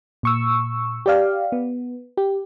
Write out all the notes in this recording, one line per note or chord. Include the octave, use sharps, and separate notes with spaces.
A#2 C#6 E6
G4 D5 F5
B3
G4